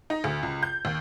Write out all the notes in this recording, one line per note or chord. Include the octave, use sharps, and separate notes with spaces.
D#4
D2
C#2
G6
D#2